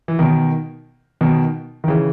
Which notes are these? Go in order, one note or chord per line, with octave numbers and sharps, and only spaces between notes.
E3
B2 D#3
B2 D#3
D#3
C#3 E3